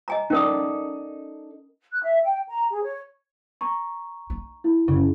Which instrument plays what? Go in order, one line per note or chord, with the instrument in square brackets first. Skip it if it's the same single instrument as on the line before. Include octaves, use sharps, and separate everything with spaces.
[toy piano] D#5 G#5 A#5
[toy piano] C#4 A#4 D#6 [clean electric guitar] D#4 A4 D5
[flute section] F#6
E5
G5
A#5
G#4
C#5
[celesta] A#5 C#6
[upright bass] D#4
[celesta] E4
[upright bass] F#2 [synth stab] C#3